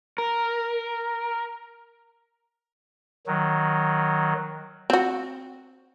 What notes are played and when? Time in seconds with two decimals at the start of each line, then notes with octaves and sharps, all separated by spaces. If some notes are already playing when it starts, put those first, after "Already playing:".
0.18 A#4
3.26 D#3 F#3
4.90 C4 F#4